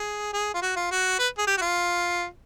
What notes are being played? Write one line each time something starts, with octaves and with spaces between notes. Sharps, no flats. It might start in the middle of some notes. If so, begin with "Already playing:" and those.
Already playing: G#4
G#4
F4
F#4
F4
F#4
B4
G#4
G4
F#4
F4